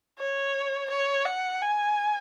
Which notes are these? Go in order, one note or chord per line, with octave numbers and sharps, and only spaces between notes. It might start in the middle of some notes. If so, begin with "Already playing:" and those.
C#5
C#5
F#5
G#5